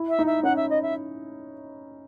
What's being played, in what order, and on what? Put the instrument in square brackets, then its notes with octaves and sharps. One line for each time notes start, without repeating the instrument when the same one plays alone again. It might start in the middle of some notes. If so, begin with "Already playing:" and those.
Already playing: [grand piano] E4
[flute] E5
[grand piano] D#4
[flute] E5
[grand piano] C#4 [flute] F#5
[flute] E5
D#5
E5